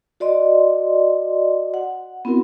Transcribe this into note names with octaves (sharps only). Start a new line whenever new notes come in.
F#4 D5 D#5 C6
F#5
B3 C4 E4 F#4 A#4